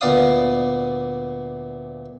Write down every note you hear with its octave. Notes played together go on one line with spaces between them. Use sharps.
D2 A#2 B3 D5 F5 D#6